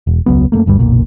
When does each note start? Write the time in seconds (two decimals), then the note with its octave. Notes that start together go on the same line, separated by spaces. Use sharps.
0.07 E1
0.26 E1 C#2 F#3 B3
0.52 F#2 C3 A3 A#3
0.66 G1 D2 G2 G3
0.79 F#1 B1 A#2